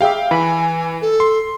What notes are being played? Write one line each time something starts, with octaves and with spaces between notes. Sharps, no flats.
G4 G#4 E5 F5 G5
E3 G#5 B5
A4
C6